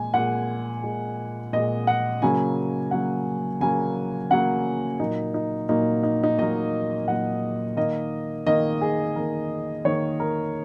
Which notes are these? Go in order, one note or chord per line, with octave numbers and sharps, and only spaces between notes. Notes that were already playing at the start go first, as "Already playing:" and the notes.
Already playing: A#2 G#3 G#5
A#2 G#3 F#5
A#2 G#3
A#2 G#3 D#5
F#5
C#3 F#3 A#3 G#5
C#3 F#3 A#3 F#5
C#3 F#3 A#3 G#5
C#3 F#3 A#3 F#5
A#2 F#3 A#3 D#4
D#4
A#2 F#3 A#3 D#4
D#4
D#4
A#2 F#3 A#3 D#5
A#2 F#3 A#3 F#5
D#3 A#3 D#5
D#3 A#3 D#5
G#4
D#3 A#3 A#4
D#3 A#3 C#5
A#4